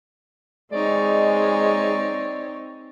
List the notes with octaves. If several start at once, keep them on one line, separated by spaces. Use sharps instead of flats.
G#3 C4 D#4 C#5 D5